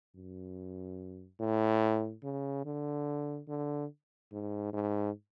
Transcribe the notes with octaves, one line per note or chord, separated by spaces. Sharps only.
F#2
A2
C#3
D3
D3
G#2
G#2